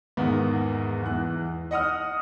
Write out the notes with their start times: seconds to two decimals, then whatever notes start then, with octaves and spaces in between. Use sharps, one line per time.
0.17 E2 G#2 D#3 A#3 B3
1.03 E2 E3 F#6
1.71 D#5 F#5 D#6 F6